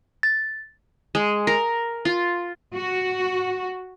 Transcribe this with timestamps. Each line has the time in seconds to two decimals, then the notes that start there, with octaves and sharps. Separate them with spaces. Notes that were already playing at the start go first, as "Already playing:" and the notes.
0.23 A6
1.15 G#3
1.47 A#4
2.05 F4
2.74 F#4